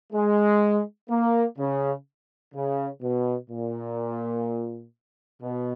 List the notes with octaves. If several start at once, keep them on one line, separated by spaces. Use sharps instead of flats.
G#3
A#3
C#3
C#3
B2
A#2
B2